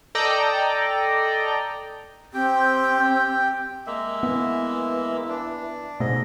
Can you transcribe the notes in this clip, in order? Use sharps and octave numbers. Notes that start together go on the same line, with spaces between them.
A4 D5 D#5 G5 A#5
C4 G4 G5
G#3 A#3 E5
E3 B3
D4
G#2 B2 A3 D#5